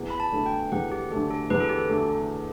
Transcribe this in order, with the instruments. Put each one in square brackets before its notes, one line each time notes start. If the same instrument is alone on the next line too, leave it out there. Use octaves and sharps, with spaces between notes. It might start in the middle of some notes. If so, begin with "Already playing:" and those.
Already playing: [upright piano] E2
[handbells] B5
A5
[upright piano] D3 A3
[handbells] G5
[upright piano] E2 [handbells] F#5
[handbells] G4
[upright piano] D3 A3 [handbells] G4
[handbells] A4
[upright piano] E2 [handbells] B4
[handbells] A4
G4
A4
[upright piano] D3 A3